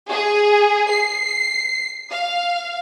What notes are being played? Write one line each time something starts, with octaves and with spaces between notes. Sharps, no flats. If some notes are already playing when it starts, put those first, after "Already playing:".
G#4
C7
F5